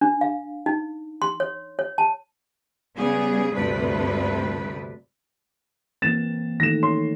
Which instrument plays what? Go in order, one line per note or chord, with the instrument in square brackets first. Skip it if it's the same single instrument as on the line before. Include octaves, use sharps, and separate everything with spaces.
[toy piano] D4
F5
D#4
C6
C#5
C#5
A5
[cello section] C#3 G3 B3 G#4
D2 G2 C3 D4 B4
[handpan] E3 A#3 C4 [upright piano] A6 E7
[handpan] D#3 E3 A3 [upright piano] A#6 E7
[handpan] C#5 [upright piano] C6